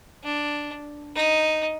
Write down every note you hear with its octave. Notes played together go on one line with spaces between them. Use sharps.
D4
D#4